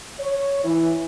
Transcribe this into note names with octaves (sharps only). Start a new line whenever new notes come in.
C#5
E3